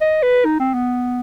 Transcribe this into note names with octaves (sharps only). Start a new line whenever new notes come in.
D#5
B4
D#4
C4
B3